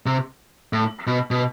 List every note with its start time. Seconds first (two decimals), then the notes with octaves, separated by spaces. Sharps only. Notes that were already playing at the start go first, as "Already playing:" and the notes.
0.06 C3
0.73 A2
1.07 B2
1.31 B2